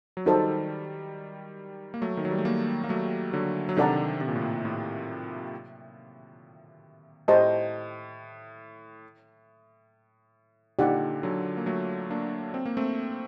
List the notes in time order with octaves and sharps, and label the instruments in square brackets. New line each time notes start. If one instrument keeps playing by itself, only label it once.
[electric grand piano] F#3
[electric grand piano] D#3 G3 [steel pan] D#4 F#4 A4 C5
[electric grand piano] A#3
F#3 A3
D#3
F#3
G3
A3
G3 A#3
A#3
F#3 A3
D3 F#3
F#3
[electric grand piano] C3 D#3 [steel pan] D4 A4 D5 F#5 A#5
[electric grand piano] C3
A#2
A2
A#2
A2
[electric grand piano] A2 [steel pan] G4 C5 D#5 A5
[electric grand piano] A#2 D3 [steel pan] D#4 G4 D5 F#5
[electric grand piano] D3 F#3
A#3
F#3 A3
A#3 D4
C4
A#3
A3 C4